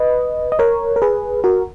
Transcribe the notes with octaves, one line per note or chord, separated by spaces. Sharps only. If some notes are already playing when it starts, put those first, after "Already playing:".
Already playing: B4 D#5
D#5
A#4 C#5
A#4
G#4 B4
F#4 A#4